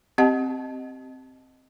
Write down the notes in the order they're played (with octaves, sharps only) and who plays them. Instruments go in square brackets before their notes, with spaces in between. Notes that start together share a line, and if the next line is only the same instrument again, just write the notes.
[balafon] C4 G4 D#5 F#5 A5